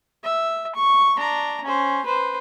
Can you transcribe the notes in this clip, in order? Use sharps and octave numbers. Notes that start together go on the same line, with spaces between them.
E5
C#6
D4 A#5
C#4 C5
B4 C5